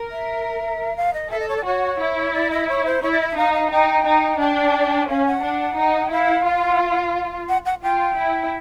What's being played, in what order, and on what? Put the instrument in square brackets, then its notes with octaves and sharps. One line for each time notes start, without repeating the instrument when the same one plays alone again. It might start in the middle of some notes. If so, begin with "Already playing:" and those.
Already playing: [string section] A#4
[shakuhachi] E5
F5
D#5
[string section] A4 [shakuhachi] E5
[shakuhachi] D#5
C#5
D5
[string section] F#4 [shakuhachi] C#5
[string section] E4
[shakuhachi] D5
D#5
C#5
C5
[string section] E4 [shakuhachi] C#5
[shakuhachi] D5
D#5
E5
[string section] D#4 [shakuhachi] F5
[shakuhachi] F5
[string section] D#4 [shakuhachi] G5
[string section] D#4
[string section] D4 [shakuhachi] G5
[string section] C#4 [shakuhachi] F5
[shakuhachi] F#5
[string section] D4
D#4
[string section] E4 [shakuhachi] F5
[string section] F4
[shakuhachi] F#5
F#5
[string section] F4 [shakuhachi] G5
[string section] E4